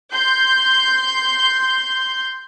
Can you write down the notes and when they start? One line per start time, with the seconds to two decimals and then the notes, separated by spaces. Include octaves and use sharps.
0.12 C6 G6